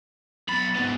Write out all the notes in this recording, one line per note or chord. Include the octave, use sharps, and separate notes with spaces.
B1 B5 A6
G#2 B3